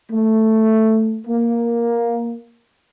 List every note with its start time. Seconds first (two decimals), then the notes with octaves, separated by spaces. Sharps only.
0.12 A3
1.27 A#3